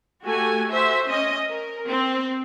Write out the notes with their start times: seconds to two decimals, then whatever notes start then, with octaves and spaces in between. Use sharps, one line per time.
0.23 A3 F#4 G4 G#5
0.69 F#4 C5 E5
1.07 C#4 D#5
1.50 A#4
1.88 C4